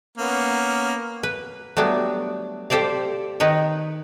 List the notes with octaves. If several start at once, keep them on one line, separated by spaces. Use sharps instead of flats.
A#3 B3 C#4
B4
F#3 G3 A3 B3 D4
G4 A4 C5 D5 F5
D#3 D#4 B4 C#5